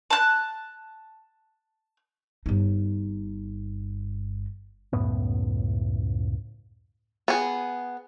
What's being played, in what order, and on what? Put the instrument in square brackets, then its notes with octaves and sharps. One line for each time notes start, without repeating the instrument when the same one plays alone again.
[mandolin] A5 F#6
[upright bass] G1 D#4
[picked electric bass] C#2 F#2 A2 B3
[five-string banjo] B3 G#4